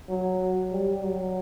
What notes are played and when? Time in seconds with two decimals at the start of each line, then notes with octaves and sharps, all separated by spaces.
0.09 F#3
0.71 G3
1.02 F#3